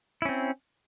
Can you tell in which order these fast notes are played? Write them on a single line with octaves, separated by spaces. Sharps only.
E4 C#4 C4